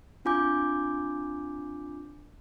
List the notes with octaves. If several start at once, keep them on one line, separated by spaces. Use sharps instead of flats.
C4 D4 F4 G#5 D6 G6